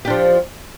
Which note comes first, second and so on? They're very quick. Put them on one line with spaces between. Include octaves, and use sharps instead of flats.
G4 D4 F3